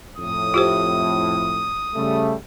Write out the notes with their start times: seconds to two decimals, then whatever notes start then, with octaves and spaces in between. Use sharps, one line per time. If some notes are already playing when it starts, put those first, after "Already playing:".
0.18 F2 A2 D#6
0.54 F4 G4 C5
1.95 C#3 G3 A3